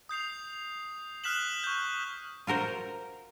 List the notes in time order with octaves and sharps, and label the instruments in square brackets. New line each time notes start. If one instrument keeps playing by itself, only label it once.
[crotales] D#6 G6 C7 F7
D#6 F6 F#6 B6 E7 F#7
C#6 G6
[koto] F4 F#4 A#4 C5